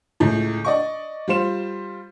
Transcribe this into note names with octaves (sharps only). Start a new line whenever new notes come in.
C#2 A2
D5 D#5 C#6
G3 F4 C5 E7